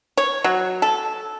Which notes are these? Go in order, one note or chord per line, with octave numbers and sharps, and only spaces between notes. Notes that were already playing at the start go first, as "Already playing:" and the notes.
C#5
F#3
A4